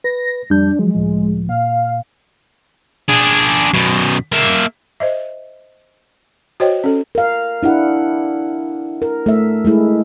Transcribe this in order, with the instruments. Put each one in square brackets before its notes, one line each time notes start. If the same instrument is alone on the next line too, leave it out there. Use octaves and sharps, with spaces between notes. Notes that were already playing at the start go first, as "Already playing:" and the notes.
[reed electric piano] B4 [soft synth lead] A#6
[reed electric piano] F2 G3 G6 [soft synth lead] D4
[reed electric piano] F3 F#3 [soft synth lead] G#3
[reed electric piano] C#2 A2 F3
[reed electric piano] A#2 [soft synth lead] F5
[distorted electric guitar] D4 G#4
F#2 B2
A#3 E5
[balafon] C5 D#5 E5
F#4 C5 C#5 D#5 G5
C#4 A4
[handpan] A#4 F5
D4 E4 G4 F#5
A#4
A3 E5
G#3 A3 E4 G#4